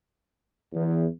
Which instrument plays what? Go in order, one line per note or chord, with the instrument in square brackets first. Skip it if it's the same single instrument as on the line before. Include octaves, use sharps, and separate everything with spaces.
[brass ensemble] E2